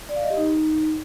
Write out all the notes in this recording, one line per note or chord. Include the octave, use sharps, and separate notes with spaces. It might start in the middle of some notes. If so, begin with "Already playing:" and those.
D5
F5
D#5
G4
D#4